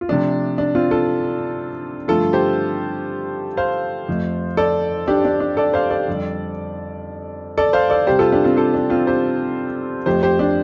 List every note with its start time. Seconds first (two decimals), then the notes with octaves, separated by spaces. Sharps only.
0.01 F4
0.08 C3 F3 A3 D4
0.58 D4
0.75 C4 F4
0.91 F4 A4
2.08 G2 D3 F3 A3 F4 A4
2.33 G4 C5
3.57 C5 F5
4.08 F2 F3 A3
4.57 A4 D5
5.07 D4 G4
5.25 D4
5.40 D4
5.57 A4 D5
5.74 C5 F5
5.90 A4 D5
6.08 F2 D3 G3
7.57 A4 D5
7.73 C5 F5
7.90 A4 D5
8.07 C3 G3 G4 C5
8.19 F4 A4
8.32 D4 G4
8.44 C4 F4
8.57 F4 A4
8.74 D4
8.90 C4 F4
9.07 G4 C5
10.06 F2 F3 A3 G4 C5
10.23 G4 C5
10.39 D4 G4